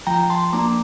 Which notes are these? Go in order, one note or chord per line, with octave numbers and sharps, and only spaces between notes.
F3 G5 A#5
A5 C6
A#3 D4 A#5 D6